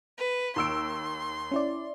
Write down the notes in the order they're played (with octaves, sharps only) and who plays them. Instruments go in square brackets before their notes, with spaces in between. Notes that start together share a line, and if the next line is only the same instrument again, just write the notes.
[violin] B4
[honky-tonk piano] D#2 E6 D7 [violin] C6
[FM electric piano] C#4 E4 D5